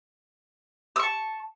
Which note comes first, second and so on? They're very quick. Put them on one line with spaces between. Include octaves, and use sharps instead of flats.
E6 C#6 A5